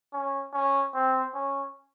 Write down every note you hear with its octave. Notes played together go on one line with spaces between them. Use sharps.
C#4
C#4
C4
C#4